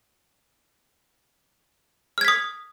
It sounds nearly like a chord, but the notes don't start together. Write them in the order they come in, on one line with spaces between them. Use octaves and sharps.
F6 G#6 B6 D#6